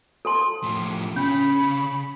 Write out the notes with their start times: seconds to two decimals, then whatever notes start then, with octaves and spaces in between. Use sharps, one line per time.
0.25 A4 A5 C6
0.63 A2 F3
1.16 C#3 C#4 B5